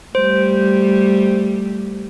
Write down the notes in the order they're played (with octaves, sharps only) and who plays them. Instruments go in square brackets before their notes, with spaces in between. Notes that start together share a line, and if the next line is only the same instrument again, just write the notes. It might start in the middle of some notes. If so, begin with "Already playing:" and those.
[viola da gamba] G3 A3 [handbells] C5